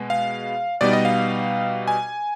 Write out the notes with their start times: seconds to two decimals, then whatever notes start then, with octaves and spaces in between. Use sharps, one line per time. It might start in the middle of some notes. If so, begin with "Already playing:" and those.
Already playing: B2 G#3 B3
0.10 F5
0.81 B2 G3 B3 D#4 D5
0.93 D#5
1.05 F5
1.88 G#5